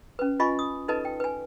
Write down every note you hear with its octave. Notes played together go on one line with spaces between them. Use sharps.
C#4 B4
F4 D#5 G#5 B5 C#6
D#6
D#4 A4 B4 D#5 A5
G5
B4 G#5